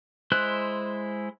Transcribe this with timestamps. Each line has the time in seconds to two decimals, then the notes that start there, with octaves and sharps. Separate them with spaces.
0.32 G#3 E4 C5 F#6